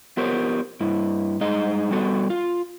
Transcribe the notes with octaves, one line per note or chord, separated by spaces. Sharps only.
B3 F4 G4 A#4 C5 C#5
G2 E4
G2 G#3 D#4 G#4 D#5
G3 B3 F#4 A4
F4